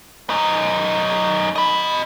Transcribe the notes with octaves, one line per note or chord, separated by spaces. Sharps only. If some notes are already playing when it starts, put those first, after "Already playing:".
F#2 D#4
D#5 B5